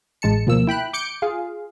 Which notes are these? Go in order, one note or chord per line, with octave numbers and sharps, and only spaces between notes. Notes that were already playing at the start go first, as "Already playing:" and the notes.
A1 G#3 A5 C#7
D2 B2 F3 A#3 E6
E4 G5 B5 F#6
D6 G6 C#7 D7
F4 G#4 F5